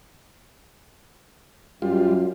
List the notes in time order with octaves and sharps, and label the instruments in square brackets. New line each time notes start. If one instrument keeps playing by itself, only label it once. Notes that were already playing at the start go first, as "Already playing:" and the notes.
[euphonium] F#2 [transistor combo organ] G3 F4